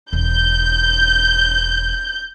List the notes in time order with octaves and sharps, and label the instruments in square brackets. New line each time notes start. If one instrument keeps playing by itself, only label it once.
[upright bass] E1 [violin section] G6